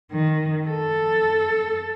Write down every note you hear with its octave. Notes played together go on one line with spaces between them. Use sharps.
D#3
A4